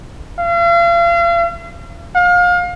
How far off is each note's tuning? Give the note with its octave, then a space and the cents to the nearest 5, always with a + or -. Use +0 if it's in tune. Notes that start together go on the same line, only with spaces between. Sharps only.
F5 -40
F5 +30